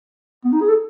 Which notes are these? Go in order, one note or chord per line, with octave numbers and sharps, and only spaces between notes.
B3
D#4
G#4
A4